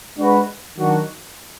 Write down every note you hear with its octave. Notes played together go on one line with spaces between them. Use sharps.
G#3 D4 F#4 B4
D#3 F#3 D4 F#4